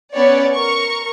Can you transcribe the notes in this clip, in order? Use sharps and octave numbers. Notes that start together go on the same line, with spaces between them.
B3 C#4 C#5 D5
A#4 C#6